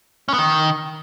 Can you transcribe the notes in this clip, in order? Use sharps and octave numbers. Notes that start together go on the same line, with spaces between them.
C#4
B3
D#3